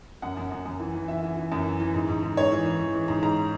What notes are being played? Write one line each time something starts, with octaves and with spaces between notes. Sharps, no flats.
F#2 F#5
F#2
F#2
F#2
E3
E3
E3 E5
E3
E3
F#2
E3
E3
G#2
G#2
G#2
G#2 C#5
E3
E3
E3
E3
G#2
G#2 A#5